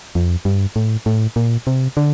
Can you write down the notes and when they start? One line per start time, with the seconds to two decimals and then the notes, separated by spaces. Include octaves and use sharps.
0.15 F2
0.45 G2
0.76 A2
1.06 A2
1.36 A#2
1.67 C3
1.97 D3